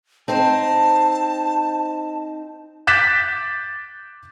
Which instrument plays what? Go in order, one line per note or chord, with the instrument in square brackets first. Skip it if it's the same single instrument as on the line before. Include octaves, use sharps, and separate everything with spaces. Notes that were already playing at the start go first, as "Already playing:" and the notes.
[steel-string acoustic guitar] C4 D#4 C5 [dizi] A5
[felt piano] D6 F#6 G6 A6 B6 E7